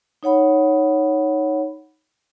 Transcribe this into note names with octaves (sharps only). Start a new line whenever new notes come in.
D#4 C#5 F#5 B5